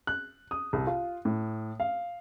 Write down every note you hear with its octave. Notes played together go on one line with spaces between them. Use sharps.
F#6
D#6
C2
F4
A2
F5